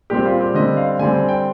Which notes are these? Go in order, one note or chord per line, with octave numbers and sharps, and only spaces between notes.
A#2 G3 C4 G4
F4
G4
D3 G3 C4 D#5
F5
D3 G3 C4 G#5
G#5
G5